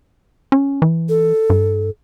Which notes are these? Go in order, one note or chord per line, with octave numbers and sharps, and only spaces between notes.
C#4
E3
A4
G2